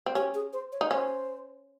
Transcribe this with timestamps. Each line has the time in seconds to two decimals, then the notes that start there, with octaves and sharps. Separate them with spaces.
0.06 C4
0.15 C#4 G4
0.34 G#4
0.53 C5
0.72 C#5
0.81 D#4
0.91 C#4 C5